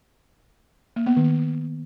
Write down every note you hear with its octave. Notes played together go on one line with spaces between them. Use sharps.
A#3
B3
D#3